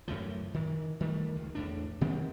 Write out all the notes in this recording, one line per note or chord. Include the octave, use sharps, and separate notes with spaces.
F#2 A2 E3 F3
D#3 E3
D#3 G3 A3
C#2
E2 A2 D4
C3 D#3 B3 C4